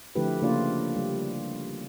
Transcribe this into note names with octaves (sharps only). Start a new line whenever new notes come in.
D3 F3 A3 E4 G4 B4
C#3 A#3 D4 F4 D5
G3